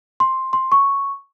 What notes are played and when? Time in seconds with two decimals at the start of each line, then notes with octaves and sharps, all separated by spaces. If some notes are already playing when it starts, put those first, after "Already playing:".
0.20 C6
0.53 C6
0.72 C#6